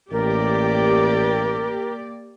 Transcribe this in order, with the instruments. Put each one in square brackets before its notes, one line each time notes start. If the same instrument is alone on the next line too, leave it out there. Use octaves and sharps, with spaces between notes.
[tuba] A1 [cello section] A#3 D5 [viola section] G4 [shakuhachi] A#4